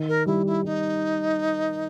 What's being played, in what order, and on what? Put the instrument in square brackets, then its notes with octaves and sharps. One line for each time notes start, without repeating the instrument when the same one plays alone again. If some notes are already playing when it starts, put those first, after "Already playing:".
Already playing: [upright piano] D#3
[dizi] A#4
[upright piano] G3 [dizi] E4
[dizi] E4
[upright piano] G3 [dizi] D#4